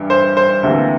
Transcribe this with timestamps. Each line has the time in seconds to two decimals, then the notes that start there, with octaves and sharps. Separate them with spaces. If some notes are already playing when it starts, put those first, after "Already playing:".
Already playing: G2 E3
0.10 C5
0.37 C5
0.63 D2 C3 E3 A#3